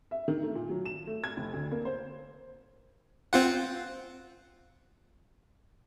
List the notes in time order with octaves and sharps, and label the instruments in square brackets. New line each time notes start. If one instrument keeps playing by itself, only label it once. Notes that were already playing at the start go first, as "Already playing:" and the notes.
[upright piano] E5
D#3
A3
A#2
F#3
E7
A3
G#6
F1
D2
A#3
C5
[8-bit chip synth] C4 F4 F#5